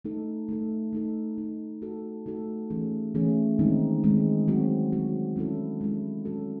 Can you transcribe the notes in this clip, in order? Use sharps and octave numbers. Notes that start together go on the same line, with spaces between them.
A3 D#4 A4
A3 D#4 A4
A3 D#4 A4
A3 D#4 A4
A3 D#4 F#4 A4
A3 D#4 F#4 A4
E3 A3 C#4 G#4
E3 A3 C#4 G#4
D#3 G#3 C4 D#4
D#3 G#3 C4 D#4
F#3 C4 F#4
F#3 C4 F#4
G#3 C#4 E4 A4
G#3 C#4 E4 A4
F#3 C#4 F#4 A4